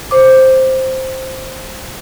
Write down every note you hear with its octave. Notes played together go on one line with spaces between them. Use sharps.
C5 D6